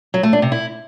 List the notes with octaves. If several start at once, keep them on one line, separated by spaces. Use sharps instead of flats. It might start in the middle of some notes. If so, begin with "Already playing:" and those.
F#3
A3
D4
C3
E4